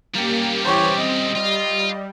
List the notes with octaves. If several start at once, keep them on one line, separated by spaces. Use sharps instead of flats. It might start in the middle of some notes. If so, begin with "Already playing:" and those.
G3 A#3 C#4 G4
E3 G4 C5 C#5
C4 D#5
G3 F4